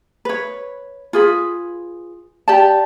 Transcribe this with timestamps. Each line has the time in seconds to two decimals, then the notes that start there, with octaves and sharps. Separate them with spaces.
0.25 B4 C#5
1.13 F4 G#4 B4
2.48 G4 D5 A5